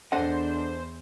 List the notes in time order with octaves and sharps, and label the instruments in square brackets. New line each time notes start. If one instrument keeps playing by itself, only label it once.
[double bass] E2 [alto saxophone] D4 [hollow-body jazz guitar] A4 D#5 F#5 [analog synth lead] C5